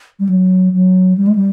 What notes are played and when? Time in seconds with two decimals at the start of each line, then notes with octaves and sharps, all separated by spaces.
0.20 G3
0.29 F#3
0.73 F#3
1.18 G3
1.27 G#3
1.35 G3